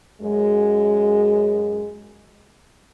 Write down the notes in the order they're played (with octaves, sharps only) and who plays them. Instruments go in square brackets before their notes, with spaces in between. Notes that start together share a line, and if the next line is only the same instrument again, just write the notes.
[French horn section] F#2 G#3